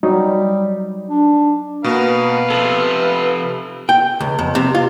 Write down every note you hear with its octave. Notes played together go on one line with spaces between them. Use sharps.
F#3 G3 D#4
D4
B2 A#3 B3 B4 F5
C3 F3 A4
G5
C#2
F2
C3
F4